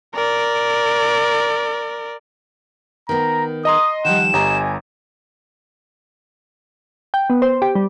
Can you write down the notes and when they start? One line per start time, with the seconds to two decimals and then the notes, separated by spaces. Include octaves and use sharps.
0.15 A#4 D5
3.09 D#3 B3 A#5
3.65 D#5 A#5 C6 D#6
4.05 D#3 F3 G3 F#5 E7
4.33 G1 G4 D#5 G#5 A#5
7.14 G5
7.30 B3
7.42 C5
7.62 G4
7.75 G3